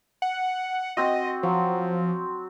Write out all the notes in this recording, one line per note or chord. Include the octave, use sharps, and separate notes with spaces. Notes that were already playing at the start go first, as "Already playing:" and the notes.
F#5
C4 F#4 D#5
F3 F#3